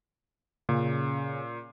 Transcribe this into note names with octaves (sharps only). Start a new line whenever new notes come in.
A#2 C#3